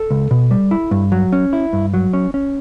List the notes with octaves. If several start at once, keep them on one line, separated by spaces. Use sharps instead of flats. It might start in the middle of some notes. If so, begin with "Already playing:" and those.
Already playing: A4
C#2
B2
G3
E4
G2
F#3
C#4
E4
G2
F#3
C#4
C#4